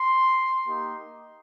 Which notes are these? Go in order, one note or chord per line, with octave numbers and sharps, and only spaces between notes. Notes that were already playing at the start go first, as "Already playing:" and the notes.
Already playing: C6
A#3 D#4 G4